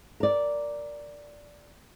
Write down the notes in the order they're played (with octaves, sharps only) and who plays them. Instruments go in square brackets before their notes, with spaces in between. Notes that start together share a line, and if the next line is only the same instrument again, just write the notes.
[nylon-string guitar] A#4 D5